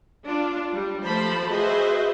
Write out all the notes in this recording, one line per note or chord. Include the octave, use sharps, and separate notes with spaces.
D4 F4
G3
F3 A3 C5 A5 B5
F#4 G#4 B4 C5 D#5 E5